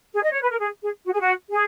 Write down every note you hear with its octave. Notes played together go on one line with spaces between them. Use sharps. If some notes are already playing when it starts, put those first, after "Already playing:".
G#4
D#5
C#5
B4
A#4
G#4
G#4
F#4
G#4
F#4
G#4